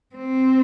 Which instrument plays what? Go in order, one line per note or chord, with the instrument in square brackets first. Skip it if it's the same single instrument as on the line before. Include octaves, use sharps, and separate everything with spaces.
[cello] C4